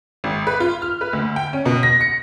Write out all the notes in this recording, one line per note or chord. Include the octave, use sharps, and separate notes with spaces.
G#1
B4
F4
F6
B4
D2
G5
C#4
B2
A#6
C#7